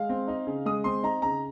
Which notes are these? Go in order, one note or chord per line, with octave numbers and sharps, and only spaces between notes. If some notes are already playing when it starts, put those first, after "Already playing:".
Already playing: G#3 F5
C4
D#4
C#3
G#3 D#6
C4 C6
D#4 A#5
C#3 A#5